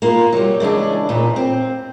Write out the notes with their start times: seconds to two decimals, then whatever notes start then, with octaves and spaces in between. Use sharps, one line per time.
0.02 A#3 B3 F4
0.33 F#3 G3
0.60 C#3 E3 G#3 D4
1.09 D#2 A#2 B4
1.36 C4